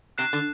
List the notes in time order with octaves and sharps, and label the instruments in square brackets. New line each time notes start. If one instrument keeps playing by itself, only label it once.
[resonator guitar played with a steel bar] C3 [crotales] F#6 C7 E7
[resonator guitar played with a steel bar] D3